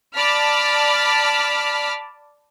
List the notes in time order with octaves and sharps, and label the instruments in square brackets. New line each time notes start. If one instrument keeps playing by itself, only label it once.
[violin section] D5 A5 B5 F6 B6